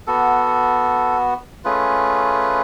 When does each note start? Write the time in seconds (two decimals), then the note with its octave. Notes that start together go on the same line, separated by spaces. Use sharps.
0.07 B3 F#4 A4
1.65 A3 C#4 F4 G#4 B4